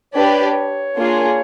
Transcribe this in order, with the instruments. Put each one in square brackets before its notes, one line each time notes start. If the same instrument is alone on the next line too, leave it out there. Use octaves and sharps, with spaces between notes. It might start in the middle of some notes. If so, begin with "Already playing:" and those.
[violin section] D4 G4 B4 D5 [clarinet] C#5
[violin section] A#3 D4 F4 G#4